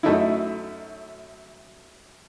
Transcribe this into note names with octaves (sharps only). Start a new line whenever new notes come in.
F#2 A3 D#4 E4